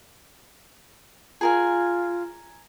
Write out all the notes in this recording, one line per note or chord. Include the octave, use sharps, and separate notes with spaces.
F4 G#4 A#4 G#5